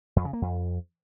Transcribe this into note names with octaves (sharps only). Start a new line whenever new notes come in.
F2
C#3
A#3
F2